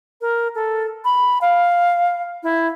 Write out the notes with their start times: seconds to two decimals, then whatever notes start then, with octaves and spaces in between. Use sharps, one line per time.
0.21 A#4
0.55 A4
1.05 B5
1.41 F5
2.43 E4